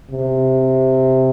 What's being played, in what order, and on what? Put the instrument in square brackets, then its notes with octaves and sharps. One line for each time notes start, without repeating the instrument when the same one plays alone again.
[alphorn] C3